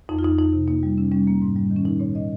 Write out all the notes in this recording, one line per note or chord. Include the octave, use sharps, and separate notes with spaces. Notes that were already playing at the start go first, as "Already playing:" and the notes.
F2 D#4
F4
F2 D#4
F2 D#4
C3
A#3 D#4
G3
C3 C#4
G3 C#4
A#3
G#2
G3
D#3
C#4
A#2 D#4
A#2 C#5
A#2 D#5